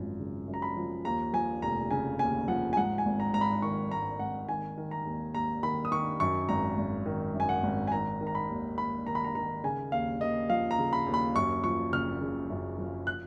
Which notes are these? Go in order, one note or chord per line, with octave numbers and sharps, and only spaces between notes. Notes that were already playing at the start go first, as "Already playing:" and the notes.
Already playing: G#1 F#2 F3
C#3
F#2
A#5
B5
F3
D#2 A#5
F3 G#5
F1 A#5
C#3 G#5
D#2 G#5
F3 F#5
G#5
G#2 F#5
G#5
G#1
A#5
G#1 A#5
B5
D#3 C#6
G#2 A#5
G#1 F#5
D#3 G#5
D#3
A#5
D#2
D#2 A#5
D#3 B5
D#6
D#3 C#6
F#2 C#6
G#1 A#5
G#1
D#3
F#2
G#5
F#5
G#1
G#5
D#3 A#5
D#3
A#5
B5
D#2
D#2 B5
D#3 A#5
B5
A#5
D#3 A#5
C#3 G#5
D#2 F5
D#2 D#5
F3 F5
A#5
C#3
B5
D#2
B5
F#2 C#6
F3 C#6
F#1 F6
C#3
F#2
F3
F#6